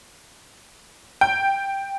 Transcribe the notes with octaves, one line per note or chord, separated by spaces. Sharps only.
G5